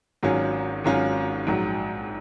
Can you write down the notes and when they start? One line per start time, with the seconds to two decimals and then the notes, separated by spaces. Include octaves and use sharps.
0.23 G#1 G#2 F#3 C#4 F4
0.84 G#1 G#2 F#3 C#4 F4
1.47 A#1 G#2 F#3